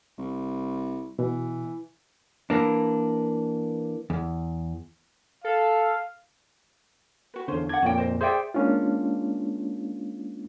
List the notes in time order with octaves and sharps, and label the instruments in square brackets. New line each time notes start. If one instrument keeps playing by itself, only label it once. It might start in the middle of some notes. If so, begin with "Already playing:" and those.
[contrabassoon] C2
[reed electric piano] B2 [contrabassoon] E3
[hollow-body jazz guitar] E3 A#3 D4
E2
[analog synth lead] A4 [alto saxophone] F5
[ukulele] F#4 B4
[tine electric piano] E2 D3 [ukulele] C#4 F4 C5
[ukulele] D4 F#5 [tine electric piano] G#6
[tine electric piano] F2 A#2 [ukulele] C#4 D4 G5
[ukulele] C5 D#5
[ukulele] G#4 E5 G5 [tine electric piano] C5 D5
[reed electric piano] G#3 A#3 C#4 D4 F4